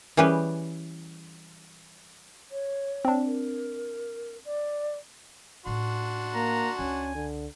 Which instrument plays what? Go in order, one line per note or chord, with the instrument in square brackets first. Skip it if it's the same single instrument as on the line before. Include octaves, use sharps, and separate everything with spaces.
[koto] E3 G3 C#4 G4 G#4 B4
[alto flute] C#5
[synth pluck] C4 D4
[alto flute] A#4
D5
[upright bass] A2 A3 [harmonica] D4 F#4 C6
[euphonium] A#3 [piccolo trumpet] A#5
[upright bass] C#2 [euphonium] C#4 [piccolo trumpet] G#5
[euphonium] D3